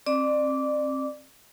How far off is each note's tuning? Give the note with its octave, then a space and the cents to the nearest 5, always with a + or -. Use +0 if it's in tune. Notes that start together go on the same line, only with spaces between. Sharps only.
C4 +30 D5 +30 D6 -15